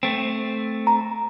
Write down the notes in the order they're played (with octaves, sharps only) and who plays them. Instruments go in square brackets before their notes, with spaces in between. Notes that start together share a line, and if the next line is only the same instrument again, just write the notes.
[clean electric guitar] A3 C4
[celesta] A#5